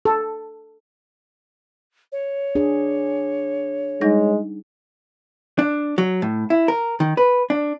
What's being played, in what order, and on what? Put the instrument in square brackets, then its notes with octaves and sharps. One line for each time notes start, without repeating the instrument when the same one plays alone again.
[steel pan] A4
[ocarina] C#5
[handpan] D4 G#4
[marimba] G3 D#4 A#6 [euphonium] G#3
[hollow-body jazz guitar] D4
F#3
A2
E4
A#4
D#3
B4
D4